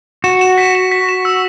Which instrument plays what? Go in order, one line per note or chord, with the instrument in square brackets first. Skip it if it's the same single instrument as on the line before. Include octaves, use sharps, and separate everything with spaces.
[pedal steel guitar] F#4 [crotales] E7
[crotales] E7
B6
E7
B6
E7
E6